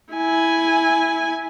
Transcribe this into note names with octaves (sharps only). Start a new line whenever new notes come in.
E4 G#5